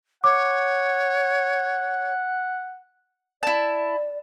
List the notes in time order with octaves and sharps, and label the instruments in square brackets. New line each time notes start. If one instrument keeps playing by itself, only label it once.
[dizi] C#5 [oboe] F#5 [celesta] D6
[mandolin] E4 A5 [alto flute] D5